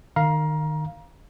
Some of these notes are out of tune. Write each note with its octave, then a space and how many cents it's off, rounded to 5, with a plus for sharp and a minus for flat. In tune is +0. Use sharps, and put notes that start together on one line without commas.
D#3 -25 F5 +0 A#5 +25